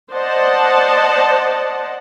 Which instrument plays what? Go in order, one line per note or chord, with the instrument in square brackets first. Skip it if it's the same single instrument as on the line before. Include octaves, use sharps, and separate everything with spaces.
[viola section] C5 D5 D#5 F#5 A5